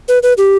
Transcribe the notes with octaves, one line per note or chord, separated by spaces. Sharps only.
B4
B4
G4